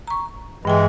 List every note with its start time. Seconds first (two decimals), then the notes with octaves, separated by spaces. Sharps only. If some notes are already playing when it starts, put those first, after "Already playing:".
0.07 A#5 C#6
0.65 G2 E3 G#3 G5 G#5